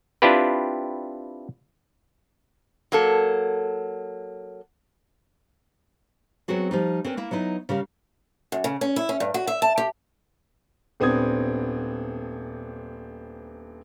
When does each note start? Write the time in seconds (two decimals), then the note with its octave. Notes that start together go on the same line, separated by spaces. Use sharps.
0.22 C4 D4 E4 F4 G4 B4
2.92 F#3 A#3 A4
6.48 F#3 B3 C4 F#4 G#4
6.71 F3 G3 D#4
7.04 C4 C#4 A#4 B4
7.17 A#3 E4
7.31 F#3 B3 D#4 E4
7.69 C#3 G3 A#4 F5
8.52 F#2
8.64 C#3
8.81 C#4
8.96 E4
9.09 C#4
9.20 G2
9.34 F#4
9.47 E5
9.62 A5
9.78 G4
11.00 D#1 B3 C4 D4 D#6 G#6